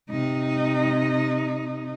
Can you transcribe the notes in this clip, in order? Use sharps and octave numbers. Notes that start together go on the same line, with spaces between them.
C3 D#4